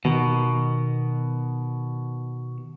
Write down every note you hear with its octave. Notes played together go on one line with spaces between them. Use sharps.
B2 D#3